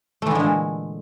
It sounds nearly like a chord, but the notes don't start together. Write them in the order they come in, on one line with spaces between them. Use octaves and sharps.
A3 E3 D3 G#3 A#2